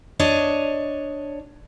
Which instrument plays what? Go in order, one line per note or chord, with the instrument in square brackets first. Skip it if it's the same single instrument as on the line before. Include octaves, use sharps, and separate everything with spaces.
[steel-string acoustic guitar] D4 C#5 D#5